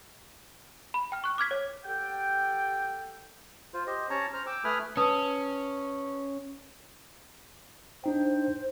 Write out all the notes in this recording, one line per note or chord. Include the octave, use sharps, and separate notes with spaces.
B5
G5 F6
C#6 F#6
D6 F6 G#6 B6
C#5
G4 A4 F#5 G5
F4 C5
G4 C5 D#5
C#4 C#5 A5 A#5
C5 A#5 F6
G5 D6 E6
A3 B4 G#5 B5 D#6 F6
C#4 B4 A5 D#6
D4 D#4 C5 G5